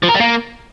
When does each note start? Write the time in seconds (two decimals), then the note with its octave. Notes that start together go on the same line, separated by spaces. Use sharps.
0.03 F3
0.09 A#4
0.15 G3
0.21 A#3